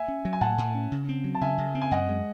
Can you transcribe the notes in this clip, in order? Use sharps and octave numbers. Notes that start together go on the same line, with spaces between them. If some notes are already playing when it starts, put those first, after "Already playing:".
Already playing: E5 G#5
C#4
F#3
G#5
A2 F#5 A5
A2
C#4
C#3
C4
F#3
A5
C#3 E5 G#5
C#3
C4
G#5
F#2 D#5 F#5
G#3